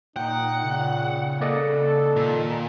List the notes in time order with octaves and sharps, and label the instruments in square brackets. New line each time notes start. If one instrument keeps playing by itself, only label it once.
[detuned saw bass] A#2 [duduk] D#4 [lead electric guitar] F#5 [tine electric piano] G5
[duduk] A#2 [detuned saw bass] C#3
[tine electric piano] A#3 D5 D#5 [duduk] A4
[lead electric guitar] A#2 [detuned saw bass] D#3